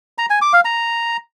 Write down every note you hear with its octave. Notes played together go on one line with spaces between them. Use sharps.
A#5
G#5
D6
F5
A#5